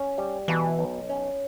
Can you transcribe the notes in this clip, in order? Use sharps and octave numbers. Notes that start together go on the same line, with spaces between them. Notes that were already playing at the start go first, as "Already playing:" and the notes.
Already playing: C#4
G3
B2 E3
B1
C#4